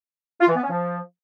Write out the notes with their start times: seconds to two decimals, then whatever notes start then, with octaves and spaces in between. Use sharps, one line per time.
0.41 F4
0.48 E3
0.56 B3
0.63 C#4
0.70 F3